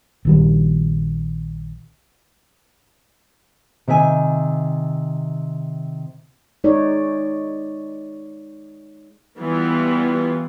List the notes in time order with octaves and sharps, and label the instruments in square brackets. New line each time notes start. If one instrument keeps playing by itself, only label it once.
[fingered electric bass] A#1 D#3 G3
[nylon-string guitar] C3 D#3 E5 F5 G#5
[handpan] G#3 D#4 C#5 D5
[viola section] E3 G3 B3 F4